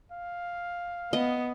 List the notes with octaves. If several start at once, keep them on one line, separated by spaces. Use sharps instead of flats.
F5
B3 D#5